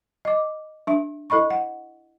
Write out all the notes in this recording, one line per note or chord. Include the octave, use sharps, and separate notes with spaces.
D#5 D6
D4 E5
E4 A4 D#5 B5 C#6
F#5